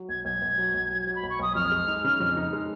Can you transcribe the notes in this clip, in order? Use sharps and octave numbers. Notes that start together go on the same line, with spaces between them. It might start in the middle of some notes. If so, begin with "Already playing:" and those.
Already playing: F#3
B1 G#6
B1 G#6
B1
F#3
B1
F#3
F#3
B5
B1
C#6
B1 D#6
F2 F6
G#3
D#4
C#3
F2
D#4
G#3